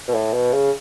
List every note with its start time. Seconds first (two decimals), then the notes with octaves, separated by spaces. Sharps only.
0.08 B2
0.14 A2
0.33 B2
0.53 C#3